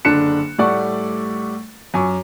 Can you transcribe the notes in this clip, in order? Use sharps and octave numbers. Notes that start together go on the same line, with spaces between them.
F#1 D3 D4 F#6 C#7 E7
A2 G3 A3 D5 F#5 C#6
F#2 G#5 C#6 D6